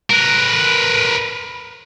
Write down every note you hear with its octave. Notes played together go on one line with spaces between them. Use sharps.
A#4 B4